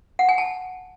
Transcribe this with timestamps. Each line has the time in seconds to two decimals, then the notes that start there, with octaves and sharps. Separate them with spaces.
0.19 F#5
0.29 G#5
0.38 A5